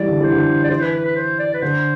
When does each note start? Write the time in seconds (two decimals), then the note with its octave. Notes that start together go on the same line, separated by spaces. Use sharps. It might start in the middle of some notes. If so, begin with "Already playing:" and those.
Already playing: E3 G3 D5
0.08 D3
0.20 E3 C5
0.32 D3
0.64 D5
0.69 E3 C5
0.81 B4
0.93 B4
1.05 B4
1.16 C5
1.39 D5
1.54 B4
1.62 D3 C5